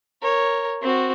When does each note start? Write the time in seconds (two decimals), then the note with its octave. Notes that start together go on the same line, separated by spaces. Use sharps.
0.22 A#4 C#5
0.82 C4 F#4